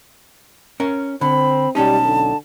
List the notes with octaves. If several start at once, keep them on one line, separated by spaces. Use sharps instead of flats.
C#4 A#4
D3 C4 B5
B1 G3 C#4 D#4 A5
D3